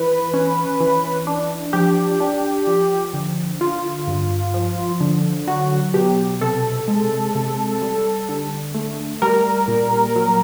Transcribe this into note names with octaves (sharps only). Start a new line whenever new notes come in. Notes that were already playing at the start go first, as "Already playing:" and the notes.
Already playing: E3 B4
C#4
E3
D4
F3 G4
D4
F3
D3
D3 F4
G2
F3
D3
F#3 F#4
B2 G4
C3 A4
G#3
C3
G3
D3
A3
G3 A#4
A#2
F#3